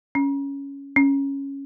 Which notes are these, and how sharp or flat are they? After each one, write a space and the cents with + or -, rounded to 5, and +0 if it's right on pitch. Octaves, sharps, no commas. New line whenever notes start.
C#4 +5
C#4 -5